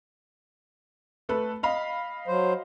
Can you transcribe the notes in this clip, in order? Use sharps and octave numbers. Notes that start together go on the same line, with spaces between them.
A3 A4 B4
D#5 F5 B5
F#3 C5